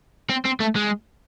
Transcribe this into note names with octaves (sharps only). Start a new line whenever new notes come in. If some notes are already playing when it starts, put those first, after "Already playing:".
C4
C4
A3
G#3